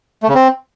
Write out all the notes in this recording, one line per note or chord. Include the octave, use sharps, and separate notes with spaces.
A3
C#3
C4